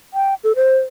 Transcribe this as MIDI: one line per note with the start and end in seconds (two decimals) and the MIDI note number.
0.14 0.34 79
0.44 0.53 69
0.56 0.78 72